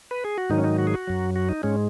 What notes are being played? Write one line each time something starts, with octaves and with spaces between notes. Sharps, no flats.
B4
G#4
F#4
G#2 D#3 F#3 D#4
C#4
D#4
F#4
G#4
F#4
F#2 F#3
F#4
D#4
G#2 G#3 C#4